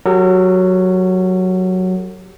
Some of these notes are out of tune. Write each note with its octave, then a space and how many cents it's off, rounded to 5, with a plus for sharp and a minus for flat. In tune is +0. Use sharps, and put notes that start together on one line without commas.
F#3 +0 G4 +20 A#4 -45